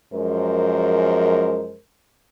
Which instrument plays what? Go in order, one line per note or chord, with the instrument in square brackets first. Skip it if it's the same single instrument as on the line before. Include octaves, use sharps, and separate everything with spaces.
[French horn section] F#2 F3 G#3 A#4 C5